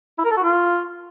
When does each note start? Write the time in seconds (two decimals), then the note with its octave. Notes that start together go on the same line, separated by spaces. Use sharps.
0.18 E4
0.25 A#4
0.31 A4
0.37 F#4
0.43 F4